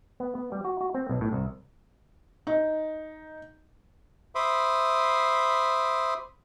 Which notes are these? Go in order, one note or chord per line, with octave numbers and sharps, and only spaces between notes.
B3
B3
G3
F#4
F#4
C4
B1
A2
C2
D#4
C5 E5 B5 C6 D6 D#6